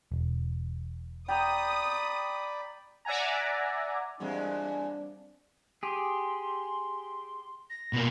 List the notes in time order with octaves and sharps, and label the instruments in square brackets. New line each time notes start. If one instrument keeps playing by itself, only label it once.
[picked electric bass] E1
[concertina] D5 B5 [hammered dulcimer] G5 A#5 [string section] D#6
[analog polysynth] D5 E5 F#5 G#5 A#5
[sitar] E2 A#2 G#3 [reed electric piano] G3 C4 [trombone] D4
[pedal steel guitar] G4 G#4 [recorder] C6
[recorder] A#6
[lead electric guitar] B2 A#3